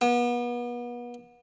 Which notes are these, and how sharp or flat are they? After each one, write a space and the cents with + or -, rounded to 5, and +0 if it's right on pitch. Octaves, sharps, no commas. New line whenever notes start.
B3 -35